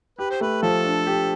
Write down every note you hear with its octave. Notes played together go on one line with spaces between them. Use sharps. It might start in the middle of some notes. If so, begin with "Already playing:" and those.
G4 B4
C5
A3 B4
F3 A4
D4
G4